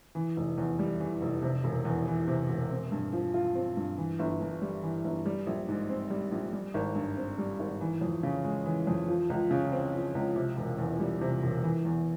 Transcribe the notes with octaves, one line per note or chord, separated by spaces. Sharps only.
E3
F1
E2
G3
E3
F1
C3
E1
E2
E3
C3
E1
C4
G2
F3
F4
C4
G2
E3
G1
G2
G3
E3
G1
G3
A#1
G#2
C4
G3
A#1
G3
G#1
G2
C4
G3
G#1
E3
F2
C#3
G#3
E3
F2
F3
C#2
C#3
C4
F3
C#2
C3
E1
E2
G3
C3
E1
E3
E2